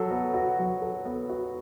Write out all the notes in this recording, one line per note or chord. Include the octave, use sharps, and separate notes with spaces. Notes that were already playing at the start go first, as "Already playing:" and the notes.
Already playing: F#3 A4
B3
F#4
F#3
A4
B3
F#4